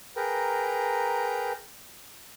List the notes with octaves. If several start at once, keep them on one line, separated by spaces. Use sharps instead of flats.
G#4 A#4 B4 G5 A#5